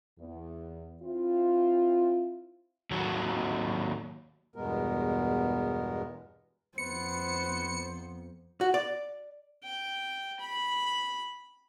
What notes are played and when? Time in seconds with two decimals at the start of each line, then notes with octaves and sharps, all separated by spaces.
0.19 E2
1.03 C4 E4 F4
2.91 D#2 F#3
4.56 E2 G2 B2 G#3 B3 A#4
6.78 F2 B3 B4 C5 C#7
8.61 F#4
8.74 D5
9.63 G5
10.40 B5